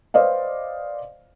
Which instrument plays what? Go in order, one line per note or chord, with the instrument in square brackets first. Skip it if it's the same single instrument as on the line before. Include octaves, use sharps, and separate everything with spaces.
[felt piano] B4 C5 D5 D#5 F5